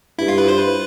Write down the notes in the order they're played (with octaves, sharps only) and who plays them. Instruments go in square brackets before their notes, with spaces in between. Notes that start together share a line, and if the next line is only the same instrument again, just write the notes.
[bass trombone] G2 [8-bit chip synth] E4
[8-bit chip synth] F4
B4
C5
B4